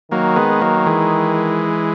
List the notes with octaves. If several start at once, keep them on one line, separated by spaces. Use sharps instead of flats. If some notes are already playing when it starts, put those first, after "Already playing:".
D#3 F#3 A#3
G#3 B3
F#3 A#3
E3 G#3